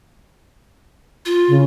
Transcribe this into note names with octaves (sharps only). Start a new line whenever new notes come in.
F4
C#3